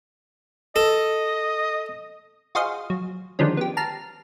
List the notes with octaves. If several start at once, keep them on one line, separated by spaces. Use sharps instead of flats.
A4 D#5
F4 F#4 G#4 C5 D#5 F5
F#3
D3 D#3 F3 G3 G#3 C#4
B3 G4
A5 A#5 F6 C7